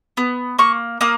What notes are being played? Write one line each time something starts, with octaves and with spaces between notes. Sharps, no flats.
B3
A#3 C#6
A#3 D#6